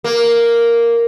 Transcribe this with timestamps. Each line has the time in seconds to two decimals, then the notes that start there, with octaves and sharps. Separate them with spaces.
0.04 A#3